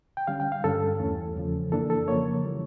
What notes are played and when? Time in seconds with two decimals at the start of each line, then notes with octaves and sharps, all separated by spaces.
0.17 G5
0.27 D3 G3 C#4 F5
0.40 G5
0.52 F5
0.64 G2 D3 G3 C#4 A4
1.00 E2 E3 A3 C#4
1.36 E2 C#3 F3
1.72 F2 E3 A#3 D4 A4
1.90 A4
2.08 C#3 F3 A#3 C#5
2.44 E3 G3